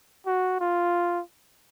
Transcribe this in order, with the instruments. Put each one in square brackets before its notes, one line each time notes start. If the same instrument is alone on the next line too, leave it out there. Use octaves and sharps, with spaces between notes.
[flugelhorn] F#4
F4